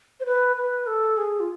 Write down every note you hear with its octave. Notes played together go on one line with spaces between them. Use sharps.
C5
B4
B4
A4
G#4
F4